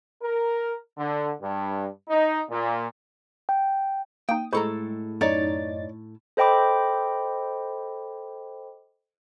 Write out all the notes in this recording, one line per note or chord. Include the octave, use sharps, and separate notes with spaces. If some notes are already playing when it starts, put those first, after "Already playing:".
A#4
D3
G2
D#4
A#2
G5
A#3 D#4 G5 D#6
A2 G#3 A4 C5 A#5 B5 C#6
F#2 D#4 C#5 D5 A6
A4 C5 D#5 G5 B5 D6